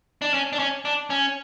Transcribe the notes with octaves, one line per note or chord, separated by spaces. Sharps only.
D4
C#4
D4
C#4
D4
C#4